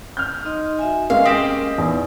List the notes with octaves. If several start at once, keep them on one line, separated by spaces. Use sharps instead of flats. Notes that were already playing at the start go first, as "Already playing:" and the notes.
F6 G6
D#4 D#5 C6
F#4 E5 G#5
G#3 A#3 C#4 F5
C4 G4 D#5
E2 D#4